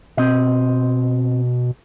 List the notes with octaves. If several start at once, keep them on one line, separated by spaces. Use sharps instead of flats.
B2 C4 D#5